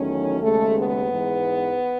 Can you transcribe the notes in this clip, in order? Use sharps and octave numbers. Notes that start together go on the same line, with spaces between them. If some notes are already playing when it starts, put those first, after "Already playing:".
Already playing: E2 D#3 F#3 A3 C#4
D#2 C#3 G#3 A3
B3
G#2 E3 G#3